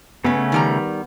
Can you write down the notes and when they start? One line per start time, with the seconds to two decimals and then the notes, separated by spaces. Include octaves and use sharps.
0.24 C#3 A3 B3 C#4 B4
0.52 D#3 G3 A#5